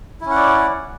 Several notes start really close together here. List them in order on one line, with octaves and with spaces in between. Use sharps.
E4 C#4 F#5 D5